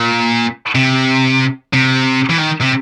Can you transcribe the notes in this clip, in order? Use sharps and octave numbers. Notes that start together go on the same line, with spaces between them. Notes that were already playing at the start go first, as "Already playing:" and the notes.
Already playing: A#2
C3
C3
E3
D#3
C3